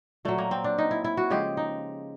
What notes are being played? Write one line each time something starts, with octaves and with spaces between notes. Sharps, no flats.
A#2 F#3 A3
A#3
C4
D4
D#4
E4
E4
F#4
C#3 F3 G#3 G4
D#4